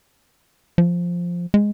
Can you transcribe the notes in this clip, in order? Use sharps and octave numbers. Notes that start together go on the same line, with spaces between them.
F3
G#3